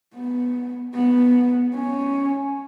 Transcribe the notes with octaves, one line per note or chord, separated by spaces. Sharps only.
B3
B3
C#4